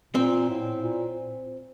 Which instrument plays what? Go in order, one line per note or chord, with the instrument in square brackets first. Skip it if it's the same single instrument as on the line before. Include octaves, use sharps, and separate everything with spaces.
[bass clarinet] A#2 [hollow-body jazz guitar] C4
[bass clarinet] A2
A#2